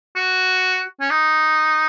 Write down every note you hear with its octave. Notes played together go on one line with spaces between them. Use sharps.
F#4
C#4
D#4